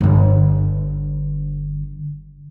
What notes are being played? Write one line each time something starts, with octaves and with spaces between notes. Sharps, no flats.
G1 D3